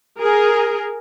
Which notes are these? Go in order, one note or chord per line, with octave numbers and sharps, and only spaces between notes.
G#4 A#4